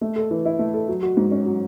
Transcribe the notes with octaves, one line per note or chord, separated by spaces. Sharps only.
A3
A4
E3
E4
A3
A4
F#3
F#4
G#2
C#4
F#3